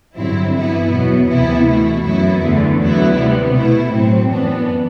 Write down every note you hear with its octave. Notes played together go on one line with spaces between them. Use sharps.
G2 D3 F#3 C4 E4
G2 E3 B3 E4
E2 B2 F#3 B3
D2 C3 E3 B3 E4
B2 A3 E4
F#2 F#3 B3 E4
E2 D3 A3
D2 D3 F#3 B3 E4
C3 G3 B3
B2 A3 E4
A2 F#3 C4
F#2 E3 B3 D4